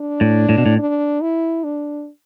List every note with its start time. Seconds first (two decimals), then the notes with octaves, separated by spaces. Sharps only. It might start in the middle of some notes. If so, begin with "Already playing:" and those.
Already playing: D4
0.21 A2
0.49 A2
0.58 B2
0.66 A2
0.78 D4
1.21 E4
1.64 D4